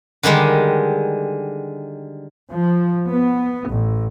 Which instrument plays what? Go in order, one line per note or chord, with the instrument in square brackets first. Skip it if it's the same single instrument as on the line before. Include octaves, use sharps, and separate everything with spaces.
[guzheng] D3 D#3 G3 G#3
[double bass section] F3
B3
A1